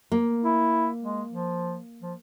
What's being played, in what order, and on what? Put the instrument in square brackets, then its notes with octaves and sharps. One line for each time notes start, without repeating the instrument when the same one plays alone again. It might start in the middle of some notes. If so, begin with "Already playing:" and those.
[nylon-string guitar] A#3
[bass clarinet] E4
G#3
F3
F3